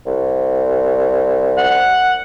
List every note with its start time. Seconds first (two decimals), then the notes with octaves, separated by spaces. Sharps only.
0.06 C2
1.58 F#5